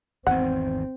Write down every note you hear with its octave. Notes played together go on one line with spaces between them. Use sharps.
G#1 E2 D#3 C4 F#5